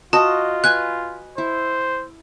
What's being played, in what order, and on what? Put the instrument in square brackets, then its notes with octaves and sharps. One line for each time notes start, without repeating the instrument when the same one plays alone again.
[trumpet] F4 [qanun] F#4 [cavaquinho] D#5 [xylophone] A5
[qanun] B4 G#5 [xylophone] F#6
[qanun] E4 [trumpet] C5